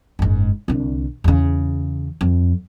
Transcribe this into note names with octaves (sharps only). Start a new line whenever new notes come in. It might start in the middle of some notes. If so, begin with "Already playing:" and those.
F#1 G#2
C2 D3
E2 C#3
F2